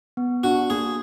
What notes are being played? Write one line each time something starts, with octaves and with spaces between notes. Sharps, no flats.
B3
D4 F#4
A#3 G#4